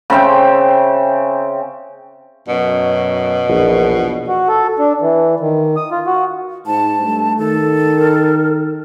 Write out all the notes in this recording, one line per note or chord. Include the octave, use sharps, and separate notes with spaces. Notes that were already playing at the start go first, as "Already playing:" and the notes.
C#3 C4 E5 G5
F#2 B2
A#1 E2
F#4
A4
D4
E3
D#3
D#6
F4
F#4
G#2 A5
G2 A3
D#3 A4
A#4